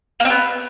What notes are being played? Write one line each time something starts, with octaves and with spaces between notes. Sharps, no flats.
A#3
C4
B3